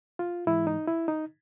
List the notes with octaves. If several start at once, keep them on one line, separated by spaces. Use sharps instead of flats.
F4
G#2 E3 G#3 E4
D#4
E4
D#4